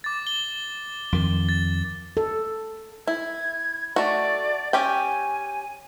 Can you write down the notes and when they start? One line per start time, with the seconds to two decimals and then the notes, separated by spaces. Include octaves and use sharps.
0.04 D6 A6
0.27 G7
1.12 F2 D#3
1.49 A6
2.17 A4
3.07 E4 G#6
3.96 A3 F#4 D5
4.73 C#4 G4 G5 G#5